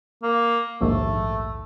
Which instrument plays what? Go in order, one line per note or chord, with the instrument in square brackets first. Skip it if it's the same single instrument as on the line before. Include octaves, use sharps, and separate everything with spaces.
[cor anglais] A#3
[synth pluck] A#1 D#2 G#2 [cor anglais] A3